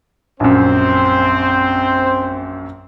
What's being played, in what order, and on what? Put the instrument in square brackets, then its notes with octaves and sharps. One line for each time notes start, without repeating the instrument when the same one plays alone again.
[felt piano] A#1 F#2 [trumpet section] C4 C5